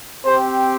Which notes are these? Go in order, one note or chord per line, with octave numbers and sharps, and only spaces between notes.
C4 G4 C5